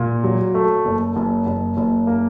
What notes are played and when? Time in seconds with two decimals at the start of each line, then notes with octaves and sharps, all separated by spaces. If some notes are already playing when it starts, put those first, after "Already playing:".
Already playing: A#2
0.24 F#3
0.55 A3
0.85 F#1
1.16 F#1
1.46 F#1
1.77 F#1
2.07 A#3